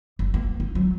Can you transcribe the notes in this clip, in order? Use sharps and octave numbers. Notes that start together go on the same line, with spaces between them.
F#1
A#3
D#4
F#3